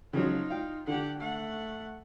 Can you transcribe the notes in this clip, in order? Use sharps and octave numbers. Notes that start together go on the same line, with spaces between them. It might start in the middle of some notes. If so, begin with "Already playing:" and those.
C#3 F3 F#3 D#4 F4
F5 G5
D3 G4 F#5
A3 F#5